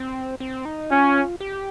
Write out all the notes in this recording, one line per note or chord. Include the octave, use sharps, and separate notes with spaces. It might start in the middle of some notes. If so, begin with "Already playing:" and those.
Already playing: C4
C4
D#4
C#4 F4
G4